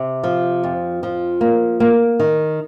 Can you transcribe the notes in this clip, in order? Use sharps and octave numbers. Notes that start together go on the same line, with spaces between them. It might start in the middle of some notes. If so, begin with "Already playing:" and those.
Already playing: C3
F3
F2
F3
A#3
A#3
D#3